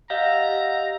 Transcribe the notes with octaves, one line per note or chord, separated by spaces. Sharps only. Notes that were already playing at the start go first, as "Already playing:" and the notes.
G4 D#5 F5 F#5 A#5 E6